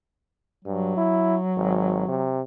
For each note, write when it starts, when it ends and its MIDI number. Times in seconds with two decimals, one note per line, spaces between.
0.65 0.94 43
0.65 2.41 54
0.97 1.36 64
1.56 2.05 32
2.08 2.41 48